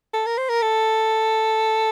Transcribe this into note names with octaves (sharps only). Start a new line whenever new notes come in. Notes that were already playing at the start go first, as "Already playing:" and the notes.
A4
A#4
C5
A#4
A4